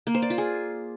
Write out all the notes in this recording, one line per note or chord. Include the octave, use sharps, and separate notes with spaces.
A#3
C5
D5
F4
G#4